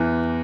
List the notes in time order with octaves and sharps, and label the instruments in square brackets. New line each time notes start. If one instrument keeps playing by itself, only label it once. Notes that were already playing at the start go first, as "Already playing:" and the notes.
Already playing: [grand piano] E2 E3